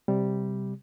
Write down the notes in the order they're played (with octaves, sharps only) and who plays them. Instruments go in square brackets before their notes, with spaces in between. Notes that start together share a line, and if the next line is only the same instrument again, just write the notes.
[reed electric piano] C3 G3